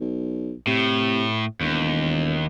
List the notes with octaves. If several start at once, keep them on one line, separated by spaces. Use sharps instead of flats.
B1
A2 C3
E1 D#2